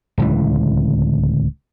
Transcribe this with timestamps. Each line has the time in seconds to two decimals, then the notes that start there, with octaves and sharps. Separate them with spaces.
0.18 D1 C#2 E3